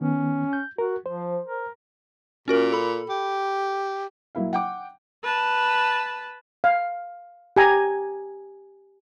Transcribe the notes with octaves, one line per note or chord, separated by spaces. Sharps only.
D#3 B3 C#4
G6
F#4 A#4
F3 C5
A#4
A#2 C#4 F#4 A#4
A4 B5
G4
F#3 A#3 E4 F5
F#5 G5 D6
B4 A5
F5
G4 G#5 A#5